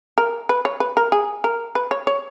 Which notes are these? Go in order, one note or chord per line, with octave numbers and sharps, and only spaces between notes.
A#4
B4
C#5
B4
A#4
G#4
A#4
B4
C#5
C#5